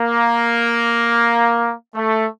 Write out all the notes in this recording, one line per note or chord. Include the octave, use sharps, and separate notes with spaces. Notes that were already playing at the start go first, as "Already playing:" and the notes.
Already playing: A#3
A3